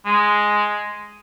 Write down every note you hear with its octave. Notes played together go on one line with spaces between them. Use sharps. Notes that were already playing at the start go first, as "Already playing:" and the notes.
G#3